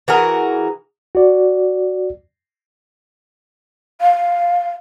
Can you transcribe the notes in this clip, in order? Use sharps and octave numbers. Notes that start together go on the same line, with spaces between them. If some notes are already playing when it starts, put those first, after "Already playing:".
E3 F#4 G#4 A#4
F#4 D5
F5